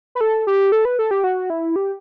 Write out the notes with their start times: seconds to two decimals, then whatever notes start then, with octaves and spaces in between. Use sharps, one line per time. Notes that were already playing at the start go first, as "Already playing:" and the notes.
0.15 B4
0.21 A4
0.47 G4
0.72 A4
0.85 B4
0.99 A4
1.11 G4
1.24 F#4
1.50 E4
1.76 G4